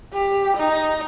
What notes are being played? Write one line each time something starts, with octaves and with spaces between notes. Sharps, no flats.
G4
D#4